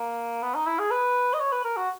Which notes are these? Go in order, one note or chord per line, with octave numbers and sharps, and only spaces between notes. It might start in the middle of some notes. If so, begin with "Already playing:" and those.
Already playing: A#3
B3
D#4
E4
G#4
B4
D#5
C#5
B4
A#4
F#4